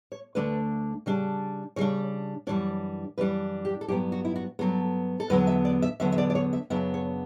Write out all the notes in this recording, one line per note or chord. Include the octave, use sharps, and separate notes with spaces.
C#5
D2 D3 A3 D4 B4
C#3 G3 D4
C#3 G3 D4 C#5
F#2 E3 G3 D4 C#5
F#2 E3 G3 D4 B4
G4
A4
G2 F#3 B3 G4
F#4
E4
F#4
G2 F#3 B3 A4
A4
E2 D3 F#3 B3 B4
E5
D5
E5
E2 D3 F#3 B3 E5
E5
D5
D5
C#5
E5
F#2 C#3 F#3 B3 D4 E5
C#5